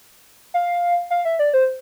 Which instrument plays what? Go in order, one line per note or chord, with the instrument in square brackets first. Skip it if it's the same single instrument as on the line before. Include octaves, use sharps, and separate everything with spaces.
[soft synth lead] F5
F5
E5
D5
C5